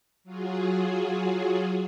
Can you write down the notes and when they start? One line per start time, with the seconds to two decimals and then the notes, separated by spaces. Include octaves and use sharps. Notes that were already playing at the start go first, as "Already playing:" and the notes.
0.24 F#3 F4 F#4 G#4